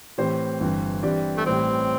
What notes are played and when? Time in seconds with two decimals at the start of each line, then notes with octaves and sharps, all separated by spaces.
0.18 A2 E3 C4 G4 C5
0.60 G1 G2 E3 C4
1.03 G2 E3 C4 G4 D5
1.37 A3
1.46 A1 A2 E3 G3 C4